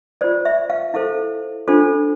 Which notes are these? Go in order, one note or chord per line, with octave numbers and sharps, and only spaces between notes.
F4 C5 D5
E5
F5
E4 A4 C5 F5
D4 F4 A4 C5